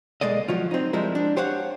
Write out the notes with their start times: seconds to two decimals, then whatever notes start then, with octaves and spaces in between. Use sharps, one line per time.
0.21 B1 G#3 A#3 D5 D#5
0.48 F3 F#3 F4
0.71 C4 D#4
0.93 F3 G3 G#3 E4 A#4
1.15 D4
1.37 G4 C5 C#5 F5 F#5